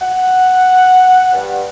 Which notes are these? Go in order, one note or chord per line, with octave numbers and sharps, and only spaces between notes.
F#5
G2